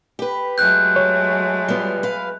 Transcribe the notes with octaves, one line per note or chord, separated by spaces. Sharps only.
G4 B4
F#3 G#3 A3 F#6 G6
C#5
G3 B3 F4
B4 F5